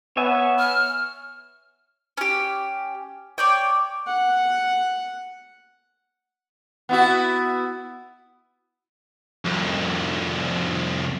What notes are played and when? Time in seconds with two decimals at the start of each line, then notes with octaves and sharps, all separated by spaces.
0.17 B3 C#5 E5 G#5
0.59 F6
2.17 C#4 G4
3.38 C#5 D5 G5
4.07 F#5
6.89 B3 E4 F#4
9.46 C2 F2